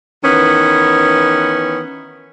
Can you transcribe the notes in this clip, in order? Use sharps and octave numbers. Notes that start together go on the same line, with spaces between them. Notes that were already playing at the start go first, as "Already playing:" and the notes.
D#3 E3 B3 C#4